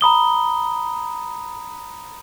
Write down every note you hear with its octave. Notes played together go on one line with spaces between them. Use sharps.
A#5 B5 D#6 G7